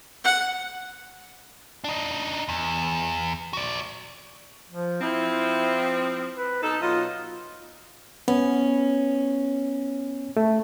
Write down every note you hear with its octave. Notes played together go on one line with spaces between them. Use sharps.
F#5
D4 D#4
E2
F#4 D5
F3
F3 C4 E4
B4
B2 D#4 A4
B2 F#3 F4 D#5
B3 C#4
A3